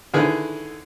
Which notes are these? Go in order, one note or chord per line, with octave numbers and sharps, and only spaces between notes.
D3 D#3 E4 G#4 B4